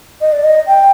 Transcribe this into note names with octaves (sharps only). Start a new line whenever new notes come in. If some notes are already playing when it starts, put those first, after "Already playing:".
D#5
D5
D#5
G5